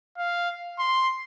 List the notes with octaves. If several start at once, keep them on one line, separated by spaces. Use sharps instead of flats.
F5
C6